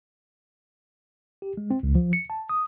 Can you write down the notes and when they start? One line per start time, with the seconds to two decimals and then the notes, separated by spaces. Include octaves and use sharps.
1.42 G4
1.57 G#3
1.71 C4
1.83 C#2
1.95 F3
2.13 C#7
2.30 A5
2.49 D#6